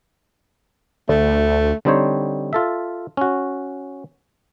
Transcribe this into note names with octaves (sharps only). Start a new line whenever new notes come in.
D2 A3
D3 G3 C4 D#4 C5 C#5
F4 A4 E5
C#4 F#4